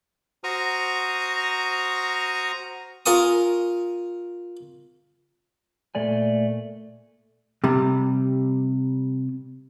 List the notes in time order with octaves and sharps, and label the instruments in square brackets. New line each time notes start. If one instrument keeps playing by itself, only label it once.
[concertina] F#4 C5 A#5 C#6 D#6 F6
[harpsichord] F4 A#4 G#5 C#6 D#6
[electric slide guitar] A#2 A3 D5 G#5
[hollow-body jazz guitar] C3 G3